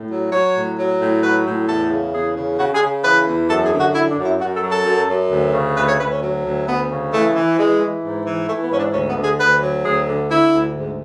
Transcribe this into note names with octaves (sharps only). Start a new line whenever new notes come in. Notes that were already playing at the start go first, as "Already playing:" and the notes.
Already playing: A2
F#3
F#3 C#5
A2
F#3
A2
F#3 B4
A2
E2 A4
C#3
E2 G#4
C#3
C#3 F#4
G#4
C#3
E3 B4
E2
F#2 A4
G#4
D3
F#4
F#2 E4
D4
F#2
E4
F#2 F#4
A4
F#3
A4
F#2
F#2
D2
C#3
D2 B4
C#5
D2 B4
C#4
F#3
D2
D2 B3
C#3
E3 A3
E3
E3 G#3
E3
G#2
E3
E3 A3
B3
G#2 C#4
D4
D2 C#4
B3
D3
G#4
D2 B4
F#3
D2 G#4
D3
D3 E4
D2
G#2